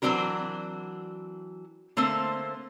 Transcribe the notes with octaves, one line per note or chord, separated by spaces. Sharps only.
E3 F#3 C4 D4 F#4 A#4
D3 A3 A#3 C4 C5